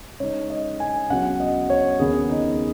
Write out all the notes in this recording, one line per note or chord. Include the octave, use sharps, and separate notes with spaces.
C#3 G#3 D#4 C#5
D#5
G#5
C#2 C#3 F#3 B3 F#5
D#5
C#5
D#2 C#3 B3 G#4
D#4